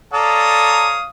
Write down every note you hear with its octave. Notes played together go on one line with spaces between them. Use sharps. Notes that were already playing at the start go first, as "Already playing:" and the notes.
A4 C#5 D5 F5 A#5 D#6